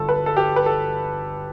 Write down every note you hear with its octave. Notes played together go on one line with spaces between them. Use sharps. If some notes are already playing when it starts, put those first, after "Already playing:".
Already playing: G1 G2 A4
B4
A4
G4
B4
A4